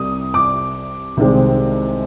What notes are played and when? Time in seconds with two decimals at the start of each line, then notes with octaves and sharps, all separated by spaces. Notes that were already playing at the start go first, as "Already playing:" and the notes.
Already playing: C2 C3 G3 D#6
0.34 D6
1.17 C2 C3 D#3 G#3 C4